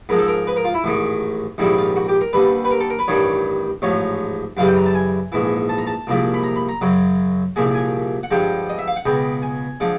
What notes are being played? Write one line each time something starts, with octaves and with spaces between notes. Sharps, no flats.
G#2 F3 G#3 A#4
A4
A#4
B4
A#4
F4
E4
A1 G#2 D#3
A#1 G#2 D#3 G3 E4
F4
F#4
G4
A#4
D#2 D3 G3 B4
B4
A#4
A4
A#4
B4
A1 G2 D#3 G3 C#5
A1 G#2 F3 C#5
F#2 C#3 E3 G3 F5
G5
A#5
A5
G#5
A#1 G#2 E3
A5
A#5
A5
C2 A#2 F3 G#3
B5
A#5
B5
A#5
F#2 C#3 F#3
C2 A#2 F3 G#3 G#5
G#5
F#5
G2 D3 F3 G#3 G5
D#5
E5
F5
F#5
C#2 B2 G#3 G5
G#5
D3 F3 G#3